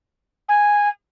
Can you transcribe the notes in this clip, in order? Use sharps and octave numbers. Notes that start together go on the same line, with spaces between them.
G#5